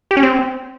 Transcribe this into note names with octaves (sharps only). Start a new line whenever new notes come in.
G4
C#4
C4